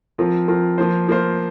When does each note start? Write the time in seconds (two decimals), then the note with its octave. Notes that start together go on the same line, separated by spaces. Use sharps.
0.18 F3 C4 F4 A#4
0.48 F3 C4 F4 A#4
0.78 F3 A#3 F4 C5
1.08 F3 A#3 F4 C5